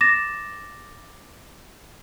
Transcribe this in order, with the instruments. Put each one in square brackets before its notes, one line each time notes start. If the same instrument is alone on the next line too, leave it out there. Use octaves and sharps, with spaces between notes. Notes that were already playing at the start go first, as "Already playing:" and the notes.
[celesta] D6 A6 A#6 E7